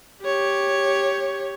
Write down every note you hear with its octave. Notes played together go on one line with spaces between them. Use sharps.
G4 C#5